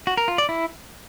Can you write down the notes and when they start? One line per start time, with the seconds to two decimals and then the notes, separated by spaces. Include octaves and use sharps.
0.07 F#4
0.17 A#4
0.28 F4
0.38 D5
0.49 E4